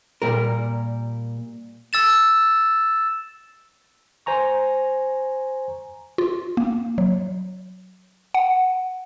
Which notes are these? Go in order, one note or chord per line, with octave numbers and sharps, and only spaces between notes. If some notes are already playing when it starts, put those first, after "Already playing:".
A#2 G3 A#4
E6 A6 E7
C5 G#5 A#5 C#6
F4
A#3
F#3
F#5